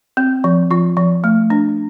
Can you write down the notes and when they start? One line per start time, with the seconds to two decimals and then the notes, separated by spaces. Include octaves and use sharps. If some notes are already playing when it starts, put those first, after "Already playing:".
0.17 C4
0.44 F3
0.71 F3 F4
0.97 F3
1.24 A3
1.50 D4